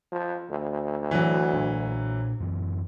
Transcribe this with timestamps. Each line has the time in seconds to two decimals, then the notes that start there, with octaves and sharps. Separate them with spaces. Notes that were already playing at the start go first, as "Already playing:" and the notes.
0.12 F3
0.50 D2
1.11 E3 F#3
1.54 A#2 D4
2.40 F#1 F#2 E3